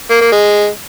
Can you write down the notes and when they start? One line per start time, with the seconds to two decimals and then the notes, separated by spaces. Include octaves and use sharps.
0.10 A#3
0.21 A#3
0.32 G#3